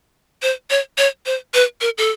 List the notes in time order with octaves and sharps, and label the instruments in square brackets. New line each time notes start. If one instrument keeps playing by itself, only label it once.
[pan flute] C5
C#5
C#5
C5
B4
A#4
A4